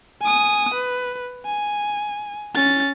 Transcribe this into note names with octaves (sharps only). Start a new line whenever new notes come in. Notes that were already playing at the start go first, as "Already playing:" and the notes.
G#5 D#6
B4
G#5
C#4 A6